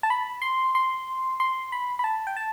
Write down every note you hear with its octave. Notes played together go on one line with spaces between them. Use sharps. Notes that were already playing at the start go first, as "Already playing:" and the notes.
A5
B5
C6
C6
C6
B5
B5
A5
G5
A5